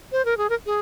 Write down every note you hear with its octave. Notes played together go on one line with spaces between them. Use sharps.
C5
A#4
G#4
A#4
G#4